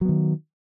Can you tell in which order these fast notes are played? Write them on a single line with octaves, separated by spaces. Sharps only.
F#3 B3 D#3